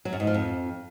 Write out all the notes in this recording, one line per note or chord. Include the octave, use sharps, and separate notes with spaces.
F#3
F#2
G#2
F3
F2